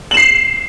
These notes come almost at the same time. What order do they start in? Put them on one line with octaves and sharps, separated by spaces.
F#7 E7 C7